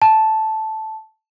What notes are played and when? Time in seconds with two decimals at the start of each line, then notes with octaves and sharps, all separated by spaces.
0.02 A5